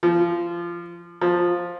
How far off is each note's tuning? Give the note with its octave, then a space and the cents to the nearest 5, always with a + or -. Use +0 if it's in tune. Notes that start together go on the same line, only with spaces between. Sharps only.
F3 -20
F3 +10